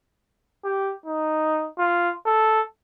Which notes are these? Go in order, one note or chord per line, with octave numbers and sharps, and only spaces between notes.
G4
D#4
F4
A4